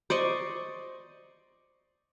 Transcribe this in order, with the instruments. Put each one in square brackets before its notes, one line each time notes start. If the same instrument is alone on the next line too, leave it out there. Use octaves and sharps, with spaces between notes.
[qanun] C5 D5 D#5 C#6